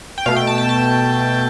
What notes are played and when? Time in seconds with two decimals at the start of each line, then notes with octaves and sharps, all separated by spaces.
0.18 G5
0.26 B2 A3 F5
0.36 G5
0.47 A5
0.58 A5
0.69 A5